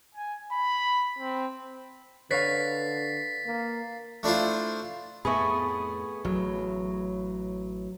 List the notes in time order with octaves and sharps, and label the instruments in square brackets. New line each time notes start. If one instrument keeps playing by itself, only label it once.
[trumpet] G#5
B5
C4
[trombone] D3 [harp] B4 C#5 F5 [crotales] A6 B6 C7
[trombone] A#3
[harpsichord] A3 D4 E4 F4 C5
[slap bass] F2 A2 [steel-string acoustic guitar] A3 B3 G#4 [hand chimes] B5 C#6
[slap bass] A1 [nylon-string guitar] F#3